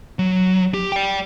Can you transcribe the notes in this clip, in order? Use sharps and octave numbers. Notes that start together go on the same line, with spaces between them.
F#3
G4
D5 G5